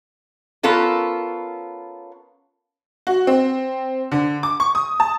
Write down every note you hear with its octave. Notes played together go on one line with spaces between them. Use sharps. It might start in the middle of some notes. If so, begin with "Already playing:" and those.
B3 C#4 F4 A4 A#4
F#4
C4
D3
D6
C#6
D#6
A5